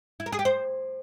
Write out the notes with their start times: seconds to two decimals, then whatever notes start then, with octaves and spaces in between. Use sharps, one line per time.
0.20 E4
0.26 A#4
0.32 G#4
0.39 G4
0.45 C5